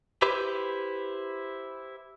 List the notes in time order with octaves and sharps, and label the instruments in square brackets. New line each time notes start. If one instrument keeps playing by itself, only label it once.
[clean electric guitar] E4 G4 B4 C5